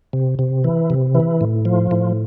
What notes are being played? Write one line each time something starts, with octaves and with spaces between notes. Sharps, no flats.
C3
C3
E3
C3
E3
A2
F3
A2